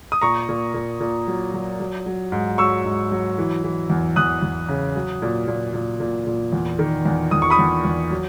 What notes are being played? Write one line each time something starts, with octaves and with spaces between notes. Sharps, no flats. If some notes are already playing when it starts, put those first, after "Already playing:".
D#6
A#2 A#5 C#6
A#2
A#2
A#2
F#3
F#3
F#3
F#3
G#2
F#3 C#6 E6
G#2
F#3
E3
E3
E2
E2 D#6 F#6
E2
C#3
F#3
A#2
A#2
A#2
A#2
A#2
E2
D#3
E2
E2 D#6
C#6
B5 D#6
E2
E2
F#3